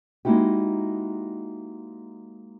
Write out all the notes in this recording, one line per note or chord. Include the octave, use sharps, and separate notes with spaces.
G#3 A#3 D#4 E4 F#4 G4